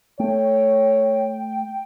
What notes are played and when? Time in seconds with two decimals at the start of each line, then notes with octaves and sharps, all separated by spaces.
0.19 A3 C#5 G5